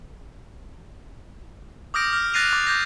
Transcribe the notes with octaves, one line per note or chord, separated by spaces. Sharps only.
D6 D#6 F6 G6 A#6 D7
F6
F#6 A6 A#6 C7 D#7 F7
D6
G6 A#6